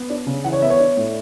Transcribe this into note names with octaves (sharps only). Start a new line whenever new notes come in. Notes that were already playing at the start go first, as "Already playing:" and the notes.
Already playing: B3
D4
C#3
E3 F#5
C#5
B3 E5
C#5
D4
A2